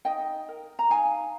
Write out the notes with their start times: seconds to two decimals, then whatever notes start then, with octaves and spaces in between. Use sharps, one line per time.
0.05 D#4 D#5 G5
0.48 A#4
0.79 A#5
0.90 D#4 F5 G#5